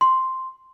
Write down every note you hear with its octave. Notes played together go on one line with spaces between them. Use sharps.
C6